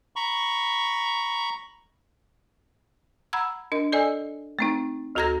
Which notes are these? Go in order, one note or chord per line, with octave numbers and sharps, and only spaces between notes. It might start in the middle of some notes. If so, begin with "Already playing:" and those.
A#5 B5 C#6
F#5 A#5 B5 E6 G#6
D4 A#4 D#5
A4 D5 D#5 G#5 E6
A3 C4 D#4
D2 F#4 A4 A#5 G#6 A#6